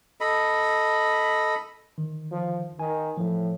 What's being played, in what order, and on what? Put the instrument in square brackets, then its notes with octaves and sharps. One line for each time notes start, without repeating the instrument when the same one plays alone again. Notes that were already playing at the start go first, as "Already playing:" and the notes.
[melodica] A4 D#5 B5
[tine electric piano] D#3
[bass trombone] F3
[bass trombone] D#3 [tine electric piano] G#5
[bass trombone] A2 [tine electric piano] F3